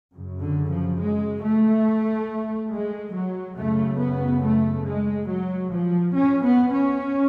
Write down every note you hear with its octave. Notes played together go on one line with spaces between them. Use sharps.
F#2 C#3
D3
F3
G#3
A3
G#3
F#3
F#2 C#3 A3
B3
A3
G#3
F#3
F3
C#4
B3
C#4